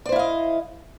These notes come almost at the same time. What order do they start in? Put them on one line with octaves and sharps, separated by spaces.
D5 C5 E4 F5 D#5